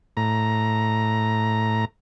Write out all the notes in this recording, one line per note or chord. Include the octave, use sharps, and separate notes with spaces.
A2 A#5